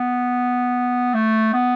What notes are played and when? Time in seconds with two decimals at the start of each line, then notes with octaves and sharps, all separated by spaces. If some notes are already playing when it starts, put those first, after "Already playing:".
Already playing: B3
1.14 A3
1.54 B3